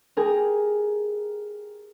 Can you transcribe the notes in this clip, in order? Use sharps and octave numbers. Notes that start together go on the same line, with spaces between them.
G4 G#4 A#4